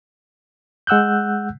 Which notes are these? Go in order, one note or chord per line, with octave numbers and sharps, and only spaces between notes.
G#3 F#5 E6 F#6 G6